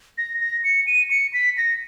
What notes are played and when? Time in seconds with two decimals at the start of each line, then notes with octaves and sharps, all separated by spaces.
0.18 A#6
0.41 A#6
0.64 C#7
0.87 D#7
1.11 C#7
1.33 B6
1.57 A#6